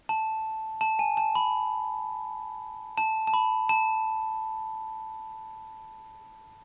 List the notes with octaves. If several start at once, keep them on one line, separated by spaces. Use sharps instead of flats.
A5
A5
G#5
A5
B5
A5
A5
B5
A5